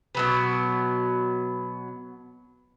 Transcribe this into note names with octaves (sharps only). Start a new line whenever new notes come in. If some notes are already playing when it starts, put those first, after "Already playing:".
B2 F#3 B3